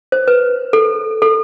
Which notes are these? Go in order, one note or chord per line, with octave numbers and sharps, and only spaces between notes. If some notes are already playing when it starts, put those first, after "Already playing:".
C5
B4
A4
A4